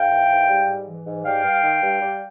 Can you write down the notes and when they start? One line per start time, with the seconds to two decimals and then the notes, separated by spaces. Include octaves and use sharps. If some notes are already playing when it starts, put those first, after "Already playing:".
Already playing: G#2 F5 G5
0.11 E3
0.30 G#2
0.49 G3
0.68 G#2
0.87 E3
1.06 G#2
1.25 G3 F5 G5
1.44 G2
1.63 D#3
1.82 G2
2.01 G3